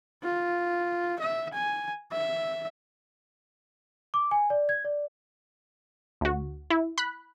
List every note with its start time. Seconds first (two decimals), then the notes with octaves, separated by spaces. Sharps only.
0.24 F4
1.20 E5
1.54 G#5
2.13 E5
4.14 D6
4.31 G#5
4.50 D5
4.69 G#6
4.85 D5
6.21 D2 F#4
6.70 E4
6.98 B5 F#6